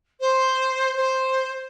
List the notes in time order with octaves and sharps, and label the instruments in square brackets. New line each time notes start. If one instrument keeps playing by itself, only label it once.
[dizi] C5
C5